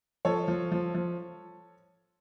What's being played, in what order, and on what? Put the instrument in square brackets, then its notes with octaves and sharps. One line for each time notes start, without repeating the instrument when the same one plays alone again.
[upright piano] F3 A4 C#5
F3
F3
F3